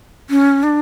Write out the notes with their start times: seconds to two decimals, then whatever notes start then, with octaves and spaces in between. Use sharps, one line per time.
0.30 C#4
0.63 D4